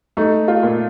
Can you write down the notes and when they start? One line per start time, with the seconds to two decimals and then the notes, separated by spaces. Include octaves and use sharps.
0.17 A3 D#4
0.48 F4
0.63 A#2